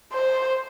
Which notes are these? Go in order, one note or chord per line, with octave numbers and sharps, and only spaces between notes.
C5